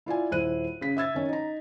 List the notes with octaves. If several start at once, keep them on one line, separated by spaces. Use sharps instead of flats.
E4 F4 D5 G#5
D#1 E4 C5 F#6 D#7
C#3 B6
E5 E6 G#6 A6
D#3 C#4
D#4 A#5